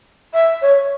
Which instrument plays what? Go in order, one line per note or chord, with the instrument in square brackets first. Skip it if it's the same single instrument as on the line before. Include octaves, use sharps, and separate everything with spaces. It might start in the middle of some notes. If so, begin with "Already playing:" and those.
[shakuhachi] E5
C#5